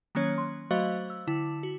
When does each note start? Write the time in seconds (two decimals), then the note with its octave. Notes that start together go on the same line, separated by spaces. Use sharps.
0.15 D#3 F#3 A#3 C#4 C#5
0.38 C6
0.71 F#3 A3 F#4 C5 D#5 F5
1.10 E6
1.27 D3 E4
1.63 F#4